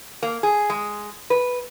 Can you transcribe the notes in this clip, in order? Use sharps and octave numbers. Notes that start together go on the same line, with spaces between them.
A#3
G#4
G#3
B4